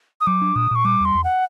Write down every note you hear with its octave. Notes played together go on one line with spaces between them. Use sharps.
D#6
F#3 D6
D4
A#2 D#6
A#2 C#6
G3 D6
E2 C6
E2
F#5